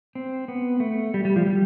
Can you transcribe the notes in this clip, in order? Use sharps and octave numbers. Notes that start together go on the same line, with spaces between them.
C4
B3
A3
G3
G3
F3
G3